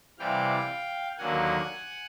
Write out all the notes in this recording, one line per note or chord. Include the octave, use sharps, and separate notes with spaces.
C3 E3 G3 F5 G5
D#2 D3 F#3 A#3 F#5 G#5